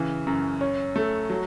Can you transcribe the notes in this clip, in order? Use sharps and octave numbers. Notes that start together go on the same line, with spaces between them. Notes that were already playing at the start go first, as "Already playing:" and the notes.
Already playing: C#3 E3
F#2
C#4
A3
F#3